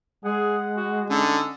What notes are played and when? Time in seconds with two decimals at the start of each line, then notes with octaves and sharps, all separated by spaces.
0.25 G#3 G#4 F#5
0.77 F#4
1.10 D3 C#4 D#4